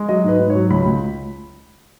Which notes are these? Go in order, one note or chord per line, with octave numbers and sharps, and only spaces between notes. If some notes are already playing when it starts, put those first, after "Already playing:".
Already playing: G#3
F#3 D#5
G#2 B4
G#2
C#5
F#3
C#2 B5
C#2